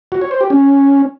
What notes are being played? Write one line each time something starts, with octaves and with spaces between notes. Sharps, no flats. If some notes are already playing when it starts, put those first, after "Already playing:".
F#4
C#5
C5
G4
C#4